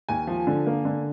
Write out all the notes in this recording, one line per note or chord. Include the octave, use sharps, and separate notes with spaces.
D#2 G#5
F3
D3
A#3
D3